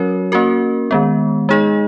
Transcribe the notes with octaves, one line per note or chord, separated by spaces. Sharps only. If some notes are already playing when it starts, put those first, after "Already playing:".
Already playing: F#3 C#4 F#4 A#4 C#5
A#3 C#4 F#4 A#4
D#3 G#3 B3
G#3 D#4 G#4 D#5